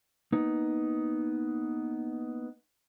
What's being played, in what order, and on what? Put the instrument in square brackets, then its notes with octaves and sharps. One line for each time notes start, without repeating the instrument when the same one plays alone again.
[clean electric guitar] A#3 B3 D#4